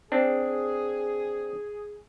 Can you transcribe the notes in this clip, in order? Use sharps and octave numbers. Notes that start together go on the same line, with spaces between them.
C4 D4 G#4